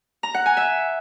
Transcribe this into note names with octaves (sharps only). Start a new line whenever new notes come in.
A#5
F#5
G#5
E5